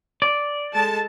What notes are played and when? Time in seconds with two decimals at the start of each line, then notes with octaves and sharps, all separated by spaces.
0.22 D5
0.74 G#3 A4 A5